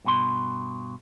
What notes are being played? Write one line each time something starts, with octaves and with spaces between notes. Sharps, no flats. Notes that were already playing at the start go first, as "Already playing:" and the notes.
G2 B2 C6